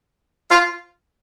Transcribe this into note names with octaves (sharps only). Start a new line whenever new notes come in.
F4